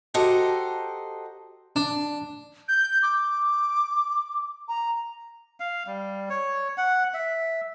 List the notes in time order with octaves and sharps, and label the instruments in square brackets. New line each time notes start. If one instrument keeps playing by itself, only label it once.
[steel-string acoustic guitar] F#4 G4 A4 C5 D#5 A#5
[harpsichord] D4
[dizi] G6
D6
A#5
[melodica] F5
G3
C#5
F#5
E5